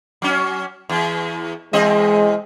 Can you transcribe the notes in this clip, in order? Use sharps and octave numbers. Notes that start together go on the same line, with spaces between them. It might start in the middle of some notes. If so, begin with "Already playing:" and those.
F#3 C#4
E2
E2 G#3 C4 D#5